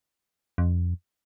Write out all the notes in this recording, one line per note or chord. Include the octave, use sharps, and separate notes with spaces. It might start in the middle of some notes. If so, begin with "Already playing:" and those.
F2